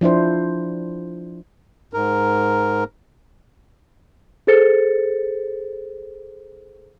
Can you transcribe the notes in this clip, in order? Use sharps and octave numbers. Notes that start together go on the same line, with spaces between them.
F3 D4 E4 C5
G#2 A#4
G#4 A4 C5 A6 C#7